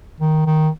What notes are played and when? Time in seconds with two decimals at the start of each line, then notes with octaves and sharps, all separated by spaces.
0.20 D#3
0.46 D#3